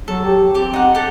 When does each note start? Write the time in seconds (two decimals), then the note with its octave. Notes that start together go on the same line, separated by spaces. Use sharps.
0.08 F#3 A4
0.25 G4
0.54 C4 G4 D6
0.74 D#4 F#5
0.95 G4 A4 F#5